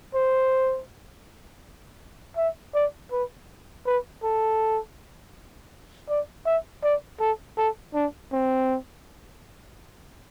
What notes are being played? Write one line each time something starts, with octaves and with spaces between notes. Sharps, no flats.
C5
E5
D5
B4
B4
A4
D5
E5
D5
A4
A4
D4
C4